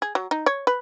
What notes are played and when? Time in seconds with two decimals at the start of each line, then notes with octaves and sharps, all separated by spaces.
0.02 G#4
0.15 F#3
0.31 D#4
0.46 C#5
0.67 B4